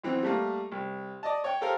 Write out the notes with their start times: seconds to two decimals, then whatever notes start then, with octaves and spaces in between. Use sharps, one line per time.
0.04 B1 E3 C4
0.23 G3 A3 A#3
0.72 C2
1.23 D5 D#5 A5
1.44 C#5 G5
1.61 G4 A4 A#4 C5 F5